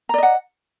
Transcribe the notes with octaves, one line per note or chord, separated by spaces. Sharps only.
D5 D#5 F#5 A#5